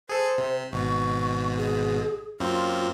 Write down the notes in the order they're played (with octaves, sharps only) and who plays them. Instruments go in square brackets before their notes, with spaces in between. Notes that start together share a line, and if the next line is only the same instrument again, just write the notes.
[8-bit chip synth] G#4 A4 [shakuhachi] C5
[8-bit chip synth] C3
[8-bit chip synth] G#1 B2 [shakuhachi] C#6
[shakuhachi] G#4
[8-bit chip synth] F#2 A#3 C4 [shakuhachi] F4